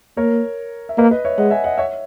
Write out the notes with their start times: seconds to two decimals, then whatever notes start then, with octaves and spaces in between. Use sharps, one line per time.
0.17 A#3 A#4 C#5
0.89 E5
0.98 A#3 B4 D#5
1.11 B4 D#5
1.25 C#5 E5
1.38 G#3 D#5 F#5
1.51 E5 G#5
1.64 D#5 F#5
1.78 C#5 E5